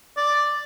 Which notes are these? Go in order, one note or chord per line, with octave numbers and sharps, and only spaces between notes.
D5